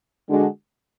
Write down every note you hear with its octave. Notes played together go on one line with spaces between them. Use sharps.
D3 G#3 D4 F#4